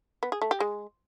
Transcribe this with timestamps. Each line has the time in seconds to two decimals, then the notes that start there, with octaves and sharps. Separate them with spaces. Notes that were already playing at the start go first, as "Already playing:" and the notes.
0.23 B3
0.32 G#4
0.42 A3
0.51 G4
0.60 G#3